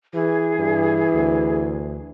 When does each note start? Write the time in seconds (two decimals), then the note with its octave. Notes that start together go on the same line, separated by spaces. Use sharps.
0.14 E3 G#4
0.58 G2 E3
1.14 D2